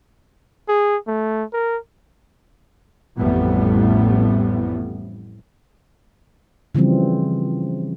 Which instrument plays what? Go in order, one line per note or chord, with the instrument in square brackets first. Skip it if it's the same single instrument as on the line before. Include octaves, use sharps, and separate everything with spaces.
[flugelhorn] G#4
A3
A#4
[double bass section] A1 F2 A2 G3 B3
[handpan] C#3 E3 F3 G3 C4